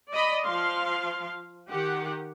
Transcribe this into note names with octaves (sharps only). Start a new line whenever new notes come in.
D5 D#5 B5
F3 F5 C6
D#3 G4 F#5